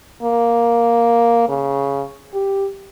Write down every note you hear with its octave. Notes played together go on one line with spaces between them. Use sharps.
A#3
C#3
G4